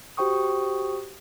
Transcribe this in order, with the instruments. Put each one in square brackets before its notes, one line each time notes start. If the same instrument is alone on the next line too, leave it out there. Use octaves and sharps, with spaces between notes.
[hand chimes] F#4 G4 C5 G5 C#6 D#6